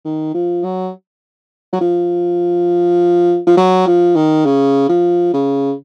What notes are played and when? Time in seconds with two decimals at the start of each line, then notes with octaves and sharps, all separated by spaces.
0.05 D#3
0.34 F3
0.63 F#3
1.73 F#3
1.81 F3
3.47 F3
3.57 F#3
3.86 F3
4.16 D#3
4.45 C#3
4.89 F3
5.33 C#3